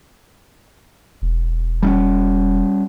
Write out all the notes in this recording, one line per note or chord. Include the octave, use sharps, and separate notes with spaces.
E1
G3 C4 C#4